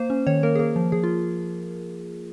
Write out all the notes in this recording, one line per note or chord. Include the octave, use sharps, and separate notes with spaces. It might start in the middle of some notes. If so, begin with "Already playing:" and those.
Already playing: A#3 C5
C#4
D#3 C#5
A#3 A#4
G#4
A#3 A#4
F3
F3 G#4
F4